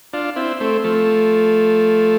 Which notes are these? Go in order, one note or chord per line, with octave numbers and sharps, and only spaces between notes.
D4 F4
C4 E4
A3 C4
F3 A3